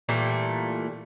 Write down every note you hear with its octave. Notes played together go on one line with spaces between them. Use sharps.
A#2 E3 G3 A3